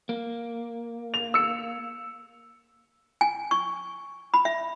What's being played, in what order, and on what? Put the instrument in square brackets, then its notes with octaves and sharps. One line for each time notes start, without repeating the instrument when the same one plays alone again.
[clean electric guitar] A#3
[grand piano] F7
E6 C#7
[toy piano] G#5
C#6
B5
E5